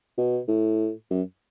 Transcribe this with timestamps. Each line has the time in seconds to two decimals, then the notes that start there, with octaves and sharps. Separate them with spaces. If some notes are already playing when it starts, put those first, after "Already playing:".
0.18 B2
0.48 A2
1.10 F#2